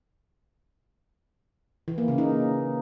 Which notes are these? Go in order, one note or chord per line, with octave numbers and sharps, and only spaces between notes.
E3
A#3
C#3
D#4